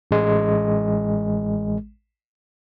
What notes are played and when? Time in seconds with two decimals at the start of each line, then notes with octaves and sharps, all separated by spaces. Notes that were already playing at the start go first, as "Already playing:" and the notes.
0.11 A1 G#3